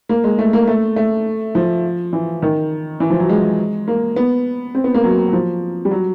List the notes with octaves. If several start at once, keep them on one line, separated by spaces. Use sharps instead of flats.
A#3
G#3
A3
A#3
A3
A3
F3
E3
D#3
E3
F3
F#3
G#3
A#3
B3
C4
B3
A#3
F#3
F#3
F3
G3
F#3